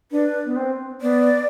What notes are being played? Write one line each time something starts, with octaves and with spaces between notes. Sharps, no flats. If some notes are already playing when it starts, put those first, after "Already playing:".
D4 B4
B3
C4
B3 D5